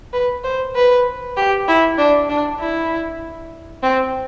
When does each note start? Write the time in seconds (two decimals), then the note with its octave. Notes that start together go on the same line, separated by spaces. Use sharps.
0.13 B4
0.44 C5
0.76 B4
1.37 G4
1.68 E4
1.98 D4
2.29 D4
2.60 E4
3.83 C4